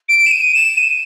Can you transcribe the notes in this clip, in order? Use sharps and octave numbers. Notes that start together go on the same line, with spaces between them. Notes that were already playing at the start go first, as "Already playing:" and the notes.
D7
E7
D#7
D#7
E7
D#7